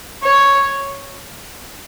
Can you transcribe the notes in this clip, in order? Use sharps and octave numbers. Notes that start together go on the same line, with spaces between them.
C#5